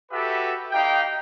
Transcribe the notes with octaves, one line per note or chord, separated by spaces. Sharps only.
F#4 G4 A4 B4 E5
D#4 G4 F5 G5